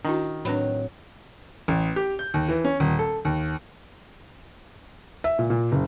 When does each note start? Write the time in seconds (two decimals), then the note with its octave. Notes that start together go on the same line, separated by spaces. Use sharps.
0.05 D#3 D4 E4 F#4
0.45 A2 F#3 C4 D4 B4 B5
1.68 A1
1.96 G4
2.19 G6
2.34 D#2
2.49 E3
2.65 C#4
2.80 D#1
2.99 A4
3.25 D#2
5.24 E5
5.39 A#2
5.50 A#2
5.72 F#1